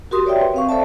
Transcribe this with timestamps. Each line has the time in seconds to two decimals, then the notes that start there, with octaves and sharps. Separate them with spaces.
0.11 F#4 G4 A#4 C6 D#6
0.26 C#5 D5 E5 G5
0.40 B4
0.54 C4 F5 C#6
0.69 A4 C5 D5 E5 A5